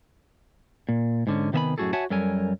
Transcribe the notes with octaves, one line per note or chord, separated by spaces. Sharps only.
A#2
G#2 D3 C#4
C3 D#3 B3 E5 G#5 B5
F#2 A2 F#4 G#4 A4
F#4 C#5 E5 F#5 G#5 A5
F#2 G3 A4 A#4 C#5 G#5